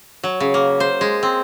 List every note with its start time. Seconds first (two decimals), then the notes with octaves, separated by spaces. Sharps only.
0.24 F#3
0.40 C#3
0.54 A#3
0.80 C5
1.01 G#3
1.23 C4